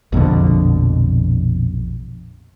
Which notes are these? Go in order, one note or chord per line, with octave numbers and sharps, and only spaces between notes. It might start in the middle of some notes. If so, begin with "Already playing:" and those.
A#1 F2 B2 D3